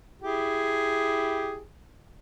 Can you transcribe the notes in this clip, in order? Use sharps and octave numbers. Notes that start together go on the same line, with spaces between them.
E4 G4 G#4